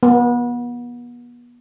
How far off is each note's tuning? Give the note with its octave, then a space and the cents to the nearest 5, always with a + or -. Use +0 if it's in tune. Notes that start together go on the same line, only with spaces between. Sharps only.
B3 -35